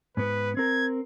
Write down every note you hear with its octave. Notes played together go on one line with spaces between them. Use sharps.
G#2 B3 B4
C4 A#4 G#6